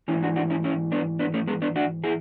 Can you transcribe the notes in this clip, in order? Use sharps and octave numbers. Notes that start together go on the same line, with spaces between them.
G#2 E3 C#4 E4
D4 F#4
D4 F#4
C#4 E4
C#4 E4
B3 D4
B3 D4
A3 C#4
G#3 B3
B3 D4
D4 F#4
E4 G#4